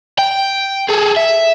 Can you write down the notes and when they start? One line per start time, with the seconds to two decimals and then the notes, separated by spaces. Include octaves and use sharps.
0.18 G5
0.89 G#4 A4
1.16 E5